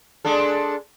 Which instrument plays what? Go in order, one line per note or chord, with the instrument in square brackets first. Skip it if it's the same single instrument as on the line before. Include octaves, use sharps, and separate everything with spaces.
[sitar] G#3 D4 A4